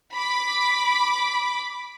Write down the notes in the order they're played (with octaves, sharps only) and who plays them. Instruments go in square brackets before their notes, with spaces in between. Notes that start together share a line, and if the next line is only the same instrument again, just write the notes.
[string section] B5 D6